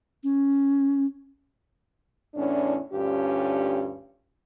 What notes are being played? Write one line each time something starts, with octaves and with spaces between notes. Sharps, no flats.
C#4
E2 A2 C#4 D4
D2 G2 C#4 F4 G4